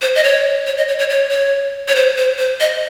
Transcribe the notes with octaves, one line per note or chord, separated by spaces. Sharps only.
C5
D#5
C#5
C#5
D#5
C#5
C#5
C#5
C#5
C#5
C5
C5
C5
D#5